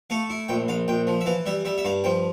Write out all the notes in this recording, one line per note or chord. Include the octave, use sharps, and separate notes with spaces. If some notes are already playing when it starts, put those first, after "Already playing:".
A3 F5
E4
A#1 G5
A#1 F5
A#1 G5
F3
E5
E3 F5
G3 E5
G3 E5
E5
G2 F5
F3 G5